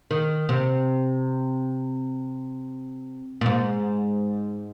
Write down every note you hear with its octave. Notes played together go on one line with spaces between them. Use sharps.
D#3
C3
A#2
G#2